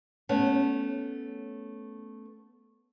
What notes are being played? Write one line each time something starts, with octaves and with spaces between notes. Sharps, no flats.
A3 B3 C#4